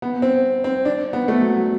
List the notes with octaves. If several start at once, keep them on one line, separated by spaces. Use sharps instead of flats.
B3
C4
C4
D4
B3
A3
F#3
F#3